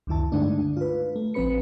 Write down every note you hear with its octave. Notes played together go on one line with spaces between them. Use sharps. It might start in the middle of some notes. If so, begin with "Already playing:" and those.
C#2 F#2 D#3 E4 A5
G2 D3 G#3 A3 D4 D#4
F4 B4
A3
A1 F3 C4 B4 B5 C#7